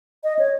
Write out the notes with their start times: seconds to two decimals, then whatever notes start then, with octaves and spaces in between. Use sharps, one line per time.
0.24 D#5
0.39 C#5